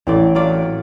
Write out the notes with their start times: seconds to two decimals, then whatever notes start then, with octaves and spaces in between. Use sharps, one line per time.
0.07 A1 A2 C4 D5
0.35 F#3 F4 D5